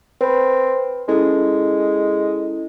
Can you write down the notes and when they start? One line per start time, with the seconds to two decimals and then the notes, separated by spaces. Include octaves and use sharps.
0.21 C4 B4 B5
1.08 G#3 C#4 E4 A4